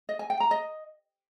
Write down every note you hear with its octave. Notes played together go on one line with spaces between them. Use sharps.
D#5
G#5
G5
A#5
D#5